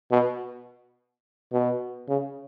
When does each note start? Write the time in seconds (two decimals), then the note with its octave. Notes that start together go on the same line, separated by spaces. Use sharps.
0.11 B2
1.52 B2
2.09 C#3